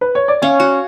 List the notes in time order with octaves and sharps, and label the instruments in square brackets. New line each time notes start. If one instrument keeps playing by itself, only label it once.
[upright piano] B4
C#5
D5
[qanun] C#4 [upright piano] C#5 F5
[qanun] F#4